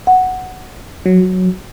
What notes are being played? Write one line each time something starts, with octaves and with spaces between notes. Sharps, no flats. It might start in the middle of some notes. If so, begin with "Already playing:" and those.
F#5
F#3